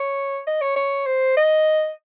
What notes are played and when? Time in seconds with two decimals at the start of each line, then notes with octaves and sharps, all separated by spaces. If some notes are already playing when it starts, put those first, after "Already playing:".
Already playing: C#5
0.47 D#5
0.61 C#5
0.76 C#5
1.06 C5
1.37 D#5